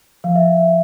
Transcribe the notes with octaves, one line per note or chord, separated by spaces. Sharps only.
F3 F5
E5